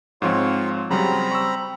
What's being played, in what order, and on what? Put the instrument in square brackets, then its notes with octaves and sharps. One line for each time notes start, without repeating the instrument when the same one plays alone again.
[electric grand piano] G#2 F3 C4 [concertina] F4 C#5
[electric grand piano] C#3 F#3 G3 [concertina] C4 A#5 B5
[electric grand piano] C#6 E6